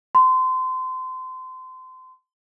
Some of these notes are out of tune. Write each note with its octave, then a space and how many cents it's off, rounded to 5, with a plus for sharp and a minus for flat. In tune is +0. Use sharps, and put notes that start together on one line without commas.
C6 -30